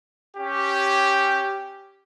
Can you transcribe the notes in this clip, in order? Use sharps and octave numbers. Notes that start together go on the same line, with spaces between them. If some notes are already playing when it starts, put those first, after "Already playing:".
C#4 G4